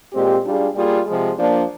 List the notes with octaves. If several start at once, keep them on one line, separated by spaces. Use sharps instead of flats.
A#2 G#3 C4 G4
G3 D4 F4 G#4
G3 A#3 F4 G#4
C3 F3 G#3
F3 A#3 D4